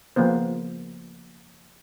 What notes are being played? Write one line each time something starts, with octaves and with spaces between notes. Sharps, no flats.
C#3 F3 A#3 B3 C5